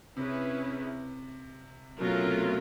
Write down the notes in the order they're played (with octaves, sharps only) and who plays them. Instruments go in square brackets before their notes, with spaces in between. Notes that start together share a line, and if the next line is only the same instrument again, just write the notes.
[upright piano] C3 [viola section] C#4 E4 G#4 B4
[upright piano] B2 [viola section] F#3 A3 C#4 F4 A#4
[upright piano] C3